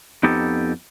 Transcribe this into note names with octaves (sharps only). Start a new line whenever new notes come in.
F2 B3 D#4 G4 A4